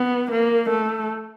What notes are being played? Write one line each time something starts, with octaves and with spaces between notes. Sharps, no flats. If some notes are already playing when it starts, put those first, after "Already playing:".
Already playing: B3
A#3
A3